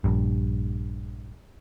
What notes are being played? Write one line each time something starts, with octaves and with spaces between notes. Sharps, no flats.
A#1 G2